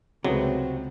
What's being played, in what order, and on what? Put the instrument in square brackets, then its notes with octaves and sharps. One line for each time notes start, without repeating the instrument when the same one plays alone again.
[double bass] C#2 C4 [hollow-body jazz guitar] C3 [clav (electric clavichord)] F#3 [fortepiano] G#3 A3 B3